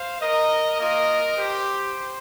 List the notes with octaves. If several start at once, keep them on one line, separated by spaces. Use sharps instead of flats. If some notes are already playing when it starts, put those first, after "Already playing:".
Already playing: C5 F5
A#4 D#5
A#3 F4 A#4 D#5
G4 C5